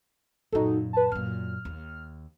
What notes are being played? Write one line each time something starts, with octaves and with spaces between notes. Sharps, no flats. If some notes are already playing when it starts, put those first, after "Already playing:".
F#2 A#2 D#4 F#4 A4
B4 A5
F#2 A#2 F6
D#2